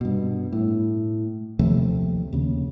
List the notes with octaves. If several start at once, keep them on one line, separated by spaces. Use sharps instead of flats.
G2 B2
A2
D#2 C3 F3 A3
D#2 C#3